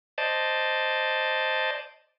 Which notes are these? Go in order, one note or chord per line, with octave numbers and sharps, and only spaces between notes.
C5 D5 D#5 A5